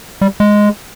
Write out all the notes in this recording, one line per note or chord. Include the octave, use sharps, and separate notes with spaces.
G3
G#3